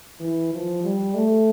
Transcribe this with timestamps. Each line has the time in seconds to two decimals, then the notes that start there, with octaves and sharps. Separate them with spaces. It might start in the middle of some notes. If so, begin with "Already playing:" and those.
0.20 E3
0.53 F3
0.83 G3
1.15 A3